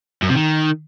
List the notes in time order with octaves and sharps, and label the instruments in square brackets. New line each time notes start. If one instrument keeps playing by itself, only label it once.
[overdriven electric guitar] F#2
C3
D#3